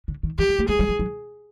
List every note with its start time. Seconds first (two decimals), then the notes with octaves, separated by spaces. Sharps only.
0.08 D3
0.23 D#3
0.38 E3 G4
0.49 G#3
0.59 A3
0.69 G#3 G#4
0.79 G3
0.89 F#3
0.99 F#3